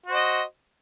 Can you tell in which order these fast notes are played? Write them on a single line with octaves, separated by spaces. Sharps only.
F#4 C5 D#5